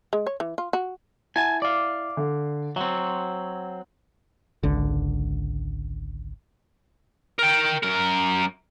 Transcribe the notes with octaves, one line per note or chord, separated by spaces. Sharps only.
G#3
C#5
E3
F4
F#4
E4 F#5 G#5 A5
D5 F5
D3
F#3 C4 F#5
G#1 C#2 D3
A#4 G5
F#2 A#4